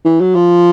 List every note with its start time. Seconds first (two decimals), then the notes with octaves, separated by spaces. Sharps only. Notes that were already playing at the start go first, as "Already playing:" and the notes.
0.05 E3
0.21 F#3
0.35 F3